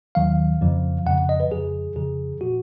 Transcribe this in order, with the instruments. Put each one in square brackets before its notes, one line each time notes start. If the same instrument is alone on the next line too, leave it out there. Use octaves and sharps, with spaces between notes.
[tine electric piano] D#2 D#3 F#3 F5
F2 C#3 F3
F2 C#3 F3 F#5
D#5
B4
F2 C#3 F3 G#4
F2 C#3 F3 G#4
A#2 F3 F#4